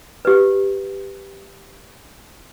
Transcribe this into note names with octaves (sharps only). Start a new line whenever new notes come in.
G4 B4